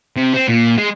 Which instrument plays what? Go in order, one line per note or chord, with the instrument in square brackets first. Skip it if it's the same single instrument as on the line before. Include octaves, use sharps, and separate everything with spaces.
[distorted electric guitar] C3
C4
A#2
G#3